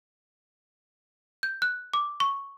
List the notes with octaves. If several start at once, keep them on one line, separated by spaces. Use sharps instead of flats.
G6
F#6
D6
C#6